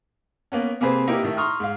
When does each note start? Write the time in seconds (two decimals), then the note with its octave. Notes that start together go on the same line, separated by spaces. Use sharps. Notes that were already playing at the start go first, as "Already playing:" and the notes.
0.52 A#3 B3 C#4
0.80 C3 A#3 C4 G#4 B4 C5
1.07 A#3 D#4 E4 G4 A#4
1.23 A2 D#3 E5
1.37 A#5 C6 C#6 D#6 F6
1.60 G#2 F5